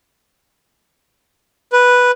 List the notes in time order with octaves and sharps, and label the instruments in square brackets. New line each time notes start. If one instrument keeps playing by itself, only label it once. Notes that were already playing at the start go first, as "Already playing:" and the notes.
[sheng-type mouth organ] B4